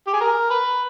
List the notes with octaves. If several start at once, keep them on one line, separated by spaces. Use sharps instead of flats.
G4
G#4
A#4
B4